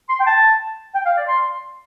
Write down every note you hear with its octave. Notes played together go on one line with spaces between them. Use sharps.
C6
G5
A5
G5
F5
D5
C6